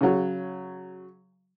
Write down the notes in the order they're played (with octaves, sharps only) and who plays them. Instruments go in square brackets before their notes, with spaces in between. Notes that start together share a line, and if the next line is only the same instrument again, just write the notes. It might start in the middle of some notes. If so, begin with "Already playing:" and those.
[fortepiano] C#3 F#3